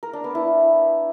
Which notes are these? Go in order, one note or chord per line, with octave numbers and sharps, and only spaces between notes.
A#4
D4
B3
E4